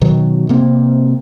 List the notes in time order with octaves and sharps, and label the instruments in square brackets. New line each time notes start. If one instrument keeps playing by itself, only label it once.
[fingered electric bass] B2 D#3 F#3
C3 A#3 C4